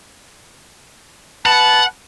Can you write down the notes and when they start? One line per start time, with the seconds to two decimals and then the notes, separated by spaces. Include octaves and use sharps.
1.46 B4 F#5 A5